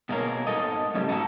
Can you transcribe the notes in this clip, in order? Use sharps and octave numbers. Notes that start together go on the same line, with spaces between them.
B2 G#3 A#3 A#4 C#5
G#2 F3 A4 D#5
F#2 A2 C#3 G3
G#2 D#4 E4 F#4 A4